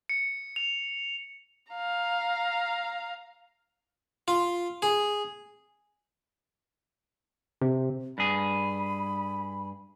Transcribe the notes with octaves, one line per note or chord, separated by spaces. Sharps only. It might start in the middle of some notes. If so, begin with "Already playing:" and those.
C#7
F7
F5 A#5
F4
G#4
C3
G2 G#4 B5